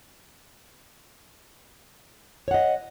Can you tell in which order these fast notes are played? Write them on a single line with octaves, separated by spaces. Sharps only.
C#5 F#5 D#5